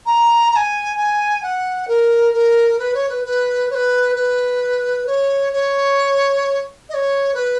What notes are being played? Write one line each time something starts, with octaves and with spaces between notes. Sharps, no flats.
A#5
A#5
G#5
G#5
F#5
A#4
A#4
B4
C#5
B4
B4
C#5
B4
B4
C#5
C#5
D#5
C#5
B4